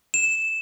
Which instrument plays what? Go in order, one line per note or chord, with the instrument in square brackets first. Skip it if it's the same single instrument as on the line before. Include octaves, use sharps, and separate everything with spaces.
[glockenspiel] E7